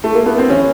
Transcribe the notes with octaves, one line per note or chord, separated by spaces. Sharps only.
A3
A#3
B3
C4
E3 C#4